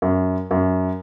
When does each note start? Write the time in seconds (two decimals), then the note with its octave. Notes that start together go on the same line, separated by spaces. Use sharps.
0.02 F#2
0.51 F#2